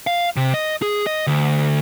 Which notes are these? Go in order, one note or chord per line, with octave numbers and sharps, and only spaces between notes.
F5
C3
D#5
G#4
D#5
D2